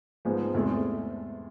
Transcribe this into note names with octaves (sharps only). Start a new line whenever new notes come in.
G#2 F3 G#3 B3
E2 C3 G#3 A3